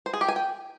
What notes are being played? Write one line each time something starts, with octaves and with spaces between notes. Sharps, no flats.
C5
G#4
G4
G#5
G5